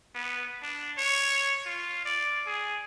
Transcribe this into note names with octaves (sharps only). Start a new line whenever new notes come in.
B3
D4
C#5
F4
D5
G#4